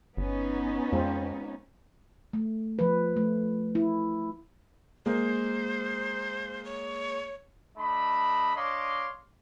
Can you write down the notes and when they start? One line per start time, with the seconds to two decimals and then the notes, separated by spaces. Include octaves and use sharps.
0.17 G1 B3 C#4 D#4
0.92 F2 G#3 C4 F4
2.33 A3
2.79 F3 B4
3.17 A3
3.75 E4
5.06 G#3 A#3 C5
6.64 C#5
7.78 A3 D4 D#5 B5
8.55 D4 C#5 D#5 F5 C6 D6